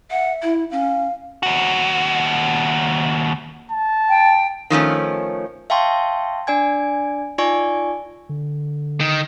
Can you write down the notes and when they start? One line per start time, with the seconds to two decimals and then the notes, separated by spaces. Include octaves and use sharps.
0.11 E5 F#5
0.42 E4
0.71 C#4 F5
1.43 D#2 F#4
3.71 A5
4.09 G5
4.70 D#3 F3 A3 C#4
5.70 E5 F5 G5 A5 C6 C#6
6.47 D4 D5 G#5 G#6
7.38 D#4 F4 D5 G#5 C#6
8.29 D3
9.01 D#3